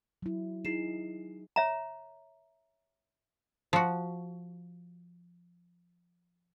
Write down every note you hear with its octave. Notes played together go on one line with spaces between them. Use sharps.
F#3 E4
D#4 E4 G#4 C7 E7
C#5 E5 A#5
F3 F#4